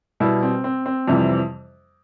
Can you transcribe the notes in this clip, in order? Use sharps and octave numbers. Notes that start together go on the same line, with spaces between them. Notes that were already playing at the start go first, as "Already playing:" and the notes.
B2 G3 E4
C4
C4
C4
F2 C3 E3 G3